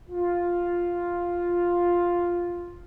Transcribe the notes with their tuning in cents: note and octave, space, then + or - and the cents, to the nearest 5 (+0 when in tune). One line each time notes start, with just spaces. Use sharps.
F4 +5